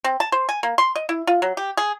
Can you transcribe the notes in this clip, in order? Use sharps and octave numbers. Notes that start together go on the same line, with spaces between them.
C4
A5
C5
G#5
A#3
C6
D#5
E4
F4
F#3
G4
G#4